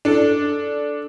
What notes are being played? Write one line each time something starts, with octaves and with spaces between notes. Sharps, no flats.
D4 A4